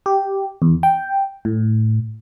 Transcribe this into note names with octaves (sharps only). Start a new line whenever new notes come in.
G4
E2
G5
A2